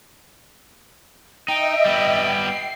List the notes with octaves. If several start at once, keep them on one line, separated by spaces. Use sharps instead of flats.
D#4 D#5 E5 G5
G3 B3
C7